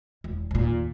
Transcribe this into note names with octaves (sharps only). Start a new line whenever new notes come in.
E1
D#2 A#2